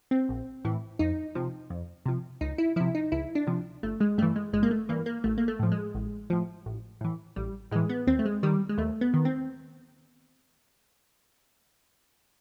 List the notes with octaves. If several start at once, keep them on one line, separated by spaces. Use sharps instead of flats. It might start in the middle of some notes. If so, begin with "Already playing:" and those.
C4
A#1
A2 E3
F2 D#4
C3 F3
F2
C3 F3
C#2 D#4
E4
C3 F3 E4
D#4
C#2 E4
D4
C3 F3
G1 A3
G#3
G2 E3 A3
G#3
G1 G#3
A#3
A3
G2 E3 A#3
A#3
A1 A3
A#3
A3
A2 F3
G#3
A1
A2 F3
A1
A2 E3
A1 G3
A2 E3 G#3
B3
D#2 C4
A3
G#3
D#3 G3
G#3
D#2 A3
B3
D#3
C4